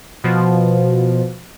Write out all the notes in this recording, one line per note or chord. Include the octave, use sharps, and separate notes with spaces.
B2 F3